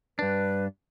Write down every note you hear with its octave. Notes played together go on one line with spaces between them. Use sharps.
G2 D4 B4